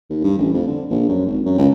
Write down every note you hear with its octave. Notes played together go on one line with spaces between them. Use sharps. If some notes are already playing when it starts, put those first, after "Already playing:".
D#2
G2
A1
F2
D3
A#1
F#2
G#1
F#2
C#2